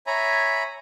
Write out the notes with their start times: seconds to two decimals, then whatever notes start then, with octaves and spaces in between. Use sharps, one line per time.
0.07 C#5 E5 G#5 A#5 B5